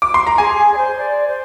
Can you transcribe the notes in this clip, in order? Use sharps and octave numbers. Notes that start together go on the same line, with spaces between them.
D6
C6
A#5
G#4 G#5
G#4
D5
C5
D5
C5